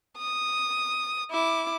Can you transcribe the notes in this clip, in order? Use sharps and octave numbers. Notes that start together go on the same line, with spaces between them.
D#6
E4 D6